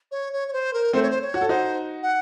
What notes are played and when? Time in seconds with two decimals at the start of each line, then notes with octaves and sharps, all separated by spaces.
0.11 C#5
0.32 C#5
0.48 C#5
0.53 C5
0.73 A#4
0.93 A3 C4 C5
1.02 C#5
1.10 C5
1.21 C#5
1.34 F#4
1.41 A4
1.48 D#4 F#4 C5
2.03 F#5